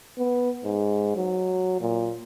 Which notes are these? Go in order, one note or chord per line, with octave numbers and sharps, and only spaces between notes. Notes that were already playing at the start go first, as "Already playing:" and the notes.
B3
G#2
F#3
A#2